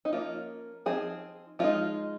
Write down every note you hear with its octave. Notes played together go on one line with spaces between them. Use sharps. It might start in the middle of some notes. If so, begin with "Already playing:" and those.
D#4
F3 A#3 C#4 F4
F3 C4 D#4 G#4
F3 G#3 D#4 F4